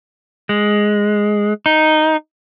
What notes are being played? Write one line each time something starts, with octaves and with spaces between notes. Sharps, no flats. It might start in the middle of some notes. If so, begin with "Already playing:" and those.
G#3
D#4